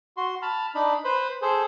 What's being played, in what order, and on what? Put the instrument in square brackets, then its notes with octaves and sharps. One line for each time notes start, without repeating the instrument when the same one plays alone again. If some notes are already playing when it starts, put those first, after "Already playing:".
[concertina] F#4 C6
A5 B5 F6
D4 D#4 B5
B4 C5 B5
G#4 A4 C5